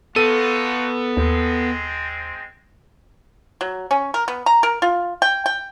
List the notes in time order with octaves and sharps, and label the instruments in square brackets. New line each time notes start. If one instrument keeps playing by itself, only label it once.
[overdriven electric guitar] B3 [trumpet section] D#4 F4 F#4 [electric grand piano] A4 D#7
[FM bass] D#2 [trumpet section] G#3 C4
[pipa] F#3
C#4
A#4
B3
A#5
A#4
F4
G5
G5